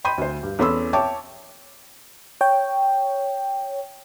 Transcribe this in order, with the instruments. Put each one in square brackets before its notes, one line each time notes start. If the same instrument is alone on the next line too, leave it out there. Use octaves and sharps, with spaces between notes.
[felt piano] G5 B5 C6 G6 D#7
D2 C5
G2
E2 C#4 A4 B5 C6 E6
C#5 E5 G5 A5 D6
[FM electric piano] C#5 G5